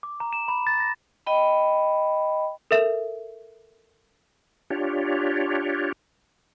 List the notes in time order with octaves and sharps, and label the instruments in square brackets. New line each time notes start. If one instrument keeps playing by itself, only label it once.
[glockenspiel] D6
A#5
E7
B5
A6
A#6
[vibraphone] D#5 G5 B5
[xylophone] A4 A#4 E5 E7
[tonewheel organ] D4 F4 G4 C#5